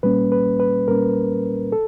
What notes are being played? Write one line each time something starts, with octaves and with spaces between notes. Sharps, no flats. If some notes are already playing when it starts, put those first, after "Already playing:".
A#2 G3 A#3 C#4 B4
B4
B4
A#2 G3 A#3 C#4 A#4
A4